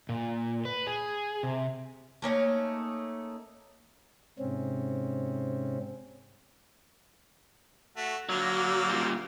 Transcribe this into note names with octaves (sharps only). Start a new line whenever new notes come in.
A#2
B4
G#4
C3
A3 A#3 C#4 D#4
G#2 C3 C4 C#4
A3 F#4
D3 F#3 A#3
A#2 G3